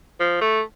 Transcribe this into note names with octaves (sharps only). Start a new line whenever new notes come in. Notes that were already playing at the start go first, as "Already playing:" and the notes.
F3
A3